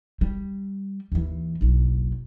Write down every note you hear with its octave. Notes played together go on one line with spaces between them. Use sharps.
G3
D#2 E3
F#1 B1